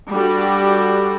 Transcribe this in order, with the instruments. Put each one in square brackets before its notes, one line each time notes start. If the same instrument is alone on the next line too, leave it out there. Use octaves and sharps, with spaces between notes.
[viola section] G3 D4 F#4 G4 A4